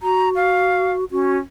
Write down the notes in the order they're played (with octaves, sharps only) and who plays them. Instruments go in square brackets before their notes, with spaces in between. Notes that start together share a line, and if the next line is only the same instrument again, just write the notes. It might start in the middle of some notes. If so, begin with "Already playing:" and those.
[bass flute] F#4 [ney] A#5
[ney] F5
[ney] C#4 [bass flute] F#4